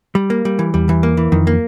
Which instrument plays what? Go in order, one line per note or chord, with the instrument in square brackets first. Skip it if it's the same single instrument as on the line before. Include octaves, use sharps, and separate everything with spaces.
[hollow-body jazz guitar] G3
A#3
G3
E3
[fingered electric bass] E2 [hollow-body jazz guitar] G3
[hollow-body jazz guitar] E3
A#3
E3
[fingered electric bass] F2 [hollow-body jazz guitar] D#3
[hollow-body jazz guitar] A#3